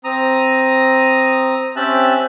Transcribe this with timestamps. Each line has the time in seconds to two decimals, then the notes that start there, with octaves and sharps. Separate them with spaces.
0.04 C4 A#5 D#6
1.76 C4 C#4 G4 E5 A5 F#6